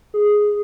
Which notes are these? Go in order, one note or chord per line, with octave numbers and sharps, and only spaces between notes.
G#4